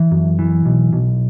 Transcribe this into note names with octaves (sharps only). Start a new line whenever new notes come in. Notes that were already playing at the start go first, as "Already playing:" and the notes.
Already playing: E3
F#2
E3
B1
B1